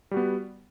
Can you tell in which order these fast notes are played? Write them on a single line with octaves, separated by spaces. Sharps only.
G3 F#4 B3